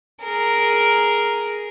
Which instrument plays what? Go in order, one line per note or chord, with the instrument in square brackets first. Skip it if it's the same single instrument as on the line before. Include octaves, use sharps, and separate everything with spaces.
[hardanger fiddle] G#4 A#4